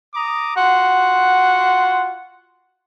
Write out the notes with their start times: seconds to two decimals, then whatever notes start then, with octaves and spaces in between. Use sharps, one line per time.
0.14 A#5 D6 D#6
0.57 F4 F#4 F#5 C6